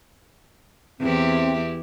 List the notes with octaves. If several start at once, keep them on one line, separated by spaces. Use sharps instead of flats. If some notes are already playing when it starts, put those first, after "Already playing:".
E2 C4 E4 G4